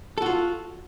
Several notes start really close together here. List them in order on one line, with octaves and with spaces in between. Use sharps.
A4 F#4 F4